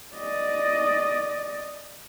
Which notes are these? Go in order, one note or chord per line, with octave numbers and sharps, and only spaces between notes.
D5 D#5